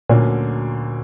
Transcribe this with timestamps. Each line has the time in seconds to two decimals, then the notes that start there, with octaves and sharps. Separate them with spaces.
0.10 D2 A#2 D3 F#3 A#3 C#4